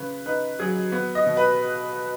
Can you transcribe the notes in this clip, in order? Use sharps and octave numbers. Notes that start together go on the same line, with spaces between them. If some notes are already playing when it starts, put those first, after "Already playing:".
Already playing: C#3 C#4 B4
D#4 B4
F#3 G#4
B3
D#5
B2
B4